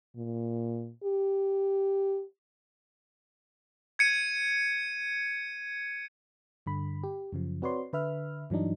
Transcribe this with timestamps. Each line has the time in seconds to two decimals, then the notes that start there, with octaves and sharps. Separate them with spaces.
0.16 A#2
1.04 G4
3.99 G#6 C#7 D#7
6.66 G2 D3 B5
7.04 G4
7.33 F#2 C#3 F3
7.62 C4 F#4 B4 C#5 D5 C6
7.93 D3 B4 E5 F6
8.50 G2 E3 F#3 D4 D#4